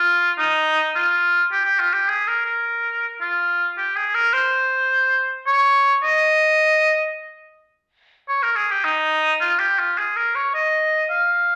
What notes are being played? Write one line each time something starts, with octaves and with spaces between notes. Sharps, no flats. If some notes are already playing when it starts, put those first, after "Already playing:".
Already playing: F4
D#4
F4
G4
G4
F4
G4
G#4
A#4
A#4
F4
G4
G#4
A#4
C5
C#5
D#5
C#5
A#4
G#4
G4
D#4
F4
G4
F4
G#4
A#4
C#5
D#5
F5